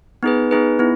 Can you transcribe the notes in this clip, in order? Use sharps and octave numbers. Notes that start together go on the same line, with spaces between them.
B3 D#4 G#4 B4
B3 D#4 G#4 B4
B3 E4